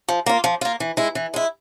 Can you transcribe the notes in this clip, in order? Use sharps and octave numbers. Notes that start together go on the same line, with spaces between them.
F3
A#3 F4
F3
A#3 F4
E3
G#3 E4
E3
G#3 E4